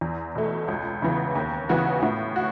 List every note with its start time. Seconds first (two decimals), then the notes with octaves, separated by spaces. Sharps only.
0.01 E2
0.35 B2 A3
0.68 C#2
1.02 C#3 E3 B3
1.35 D#2
1.69 C#3 E3 B3 F#4
2.02 A2
2.36 F#4